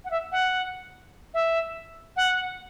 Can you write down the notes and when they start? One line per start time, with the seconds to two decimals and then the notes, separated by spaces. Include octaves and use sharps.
0.05 F#5
0.11 E5
0.32 F#5
1.34 E5
2.16 F#5